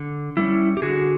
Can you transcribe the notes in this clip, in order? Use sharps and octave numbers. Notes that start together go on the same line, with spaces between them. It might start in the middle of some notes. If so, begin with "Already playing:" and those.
Already playing: D3
G3 A#3 C#4 E4
G4
D3 F#4 G#4